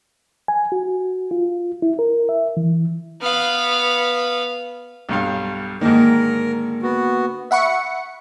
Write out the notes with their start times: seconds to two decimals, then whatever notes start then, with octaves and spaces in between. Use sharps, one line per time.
0.48 G#5
0.72 F#4
1.31 F4
1.82 E4
1.99 A#4
2.29 E5
2.57 E3
3.22 B3 F5
5.09 B1 G2 F5
5.81 G#2 D3 D#3 A#3 A#4
6.83 B3 F#4
7.51 E5 F#5 B5 C#6 C#7